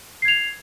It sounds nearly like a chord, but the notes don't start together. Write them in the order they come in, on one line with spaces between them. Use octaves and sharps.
C7 G#6 F7